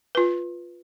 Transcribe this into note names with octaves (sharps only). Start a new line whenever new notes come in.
F4 B4